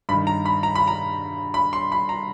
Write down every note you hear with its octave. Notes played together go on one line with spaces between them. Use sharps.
G2 D#3 B5
A#5
B5
A#5
B5
A#5
B5
C6
B5
A#5